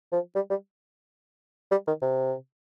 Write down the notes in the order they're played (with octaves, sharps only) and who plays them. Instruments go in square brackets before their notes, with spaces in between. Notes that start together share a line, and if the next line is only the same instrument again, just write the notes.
[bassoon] F3
G3
G3
G3
D#3
C3